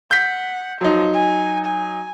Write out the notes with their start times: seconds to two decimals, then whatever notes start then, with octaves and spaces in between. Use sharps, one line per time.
0.11 F#5 G6 B6
0.81 F3 F#3 D#4
1.14 G#5
1.65 G#5